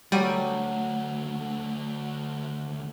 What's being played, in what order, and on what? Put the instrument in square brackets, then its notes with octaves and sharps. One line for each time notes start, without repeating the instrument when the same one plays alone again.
[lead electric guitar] D2 A3 [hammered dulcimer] F#3 [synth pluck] G3 D#7